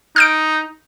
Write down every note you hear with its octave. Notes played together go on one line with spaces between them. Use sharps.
D#4 F6 G6 D7